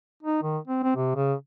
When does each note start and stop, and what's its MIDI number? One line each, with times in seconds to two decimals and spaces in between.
0.23 0.43 63
0.43 0.58 51
0.68 0.82 60
0.83 0.94 60
0.96 1.14 48
1.16 1.34 49